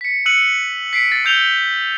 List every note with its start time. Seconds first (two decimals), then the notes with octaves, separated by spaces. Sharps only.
0.01 B6 C#7
0.26 E6 F#6 C#7 D#7 F#7
0.93 B6 C7 D7
1.08 A6 D#7
1.25 E6 G6 F7 G7